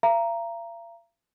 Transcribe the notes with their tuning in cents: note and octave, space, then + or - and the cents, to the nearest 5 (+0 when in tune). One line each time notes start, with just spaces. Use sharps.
F5 -45 A#5 +0